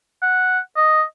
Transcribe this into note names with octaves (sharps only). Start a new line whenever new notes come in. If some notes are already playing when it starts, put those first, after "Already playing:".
F#5
D#5